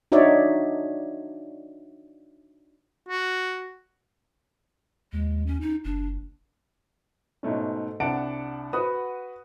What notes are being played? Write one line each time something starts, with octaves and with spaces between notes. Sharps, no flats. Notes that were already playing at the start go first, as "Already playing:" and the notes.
D4 D#4 F#4 C#5 D5 E5
F#4
D#2 G#3
C#4
D#4
F#1 D4
G#2 B2 A3 C#4
C2 D4 F#5 A5 D7
F#4 B4 F#5 D#6